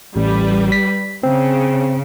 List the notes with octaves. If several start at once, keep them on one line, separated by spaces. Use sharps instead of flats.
A1 G3 B4
B6
C#3 C4